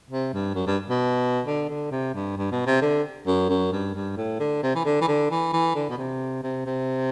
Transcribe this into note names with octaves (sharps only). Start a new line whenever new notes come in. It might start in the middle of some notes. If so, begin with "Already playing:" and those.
C3
G2
F#2
G2
B2
D3
D3
C3
G2
G2
B2
C3
D3
F#2
F#2
G2
G2
A2
D3
C3
E3
D3
E3
D3
E3
E3
D3
B2
C3
C3
C3